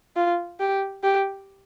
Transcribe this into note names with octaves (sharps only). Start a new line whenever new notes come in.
F4
G4
G4